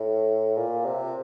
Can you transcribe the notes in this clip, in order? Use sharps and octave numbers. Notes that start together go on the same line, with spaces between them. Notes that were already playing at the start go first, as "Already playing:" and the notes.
Already playing: A2
A#2
C3